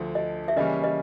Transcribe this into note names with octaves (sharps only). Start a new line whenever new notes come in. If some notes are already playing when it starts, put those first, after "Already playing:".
Already playing: D2 D3 F3
D#5
E5
C#3 E3 G3 A#3 C#4 D#5
D#5